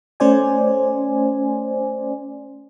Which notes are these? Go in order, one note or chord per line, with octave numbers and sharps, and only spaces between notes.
A3 C#4 C5 D5 G#5